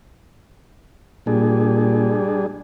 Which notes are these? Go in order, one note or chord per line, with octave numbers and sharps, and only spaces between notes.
A#2 G3 D4 G#4